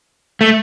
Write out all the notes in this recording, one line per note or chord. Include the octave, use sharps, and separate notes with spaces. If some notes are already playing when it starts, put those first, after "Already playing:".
A3